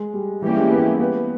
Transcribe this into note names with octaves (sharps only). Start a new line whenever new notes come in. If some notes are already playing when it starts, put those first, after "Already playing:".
Already playing: G#3
G3
E3 G3 A#3 C#4 E4 G4
G#3
B3
B3